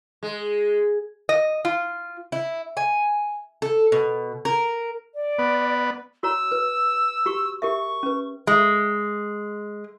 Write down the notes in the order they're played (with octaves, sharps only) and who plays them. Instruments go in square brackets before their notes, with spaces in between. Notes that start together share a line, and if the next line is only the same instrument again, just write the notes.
[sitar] G#3
[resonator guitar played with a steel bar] D#5
F4
[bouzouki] E4
G#5
A4
B2
A#4
[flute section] D5
[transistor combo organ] B3
[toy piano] F#4 C#5 A#5 [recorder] E6
[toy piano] B4
F#4 G4 C#6
[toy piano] G4 A#4 E5 [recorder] C#6
[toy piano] C#4 B4
[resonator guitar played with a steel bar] G#3